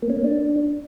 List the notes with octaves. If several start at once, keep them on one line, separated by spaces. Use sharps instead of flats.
A#3
C#4
A#3
D4